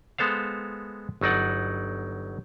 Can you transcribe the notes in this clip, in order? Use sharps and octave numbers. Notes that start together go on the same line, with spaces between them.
G#3 B3 A4 C5 F5
G1 F#3 D#4 D5 F#5